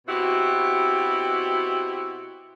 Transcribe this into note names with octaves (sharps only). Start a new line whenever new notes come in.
B2 C4 E4 F#4 G4